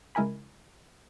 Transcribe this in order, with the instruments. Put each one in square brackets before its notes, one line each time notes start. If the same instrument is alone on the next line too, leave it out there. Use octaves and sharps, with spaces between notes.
[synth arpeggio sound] C#2 G#3 E4 A#4 G#5 B5